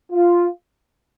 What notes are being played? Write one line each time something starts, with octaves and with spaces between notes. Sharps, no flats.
F4